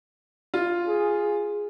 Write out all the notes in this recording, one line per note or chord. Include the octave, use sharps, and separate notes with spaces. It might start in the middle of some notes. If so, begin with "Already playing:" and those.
F4
G#4